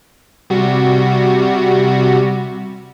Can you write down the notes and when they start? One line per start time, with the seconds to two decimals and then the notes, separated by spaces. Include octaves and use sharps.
0.50 C3 G3 F#4